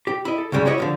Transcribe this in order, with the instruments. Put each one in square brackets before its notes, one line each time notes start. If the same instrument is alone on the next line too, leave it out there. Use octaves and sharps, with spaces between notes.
[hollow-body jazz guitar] G4
E4 D#5
A4
C#2 F#2 C#3 G3 G#3
E4 F#4 G4 C#5 D#5
D3 E3 F3